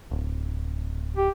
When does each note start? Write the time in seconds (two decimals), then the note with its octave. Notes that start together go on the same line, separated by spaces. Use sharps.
0.11 D1
1.17 G4